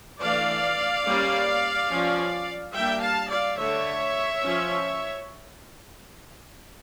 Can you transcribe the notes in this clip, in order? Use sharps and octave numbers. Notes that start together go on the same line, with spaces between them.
E3 A3 D4 D5 F5
G3 A#3 C#4
F3 C#4
G3 A#3 D4 E5 G5
F5 A5
D5 F5
D3 A3 D4 C#5 E5
F3 C#4